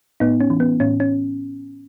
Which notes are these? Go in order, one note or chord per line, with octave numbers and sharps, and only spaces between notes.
A2 B3 D#4
C#4
E3
B3
A2 C#4
C#4